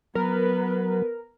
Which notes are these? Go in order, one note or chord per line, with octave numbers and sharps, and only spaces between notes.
F#3 B3 A#4 B4